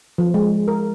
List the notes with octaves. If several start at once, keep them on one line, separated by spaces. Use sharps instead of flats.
F3
G#3
A#4